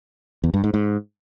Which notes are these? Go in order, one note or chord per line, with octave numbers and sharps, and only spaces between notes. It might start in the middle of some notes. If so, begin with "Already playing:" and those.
E2
G2
G#2
G#2